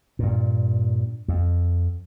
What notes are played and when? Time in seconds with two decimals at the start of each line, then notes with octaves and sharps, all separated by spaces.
0.19 G2 A#2
1.28 F2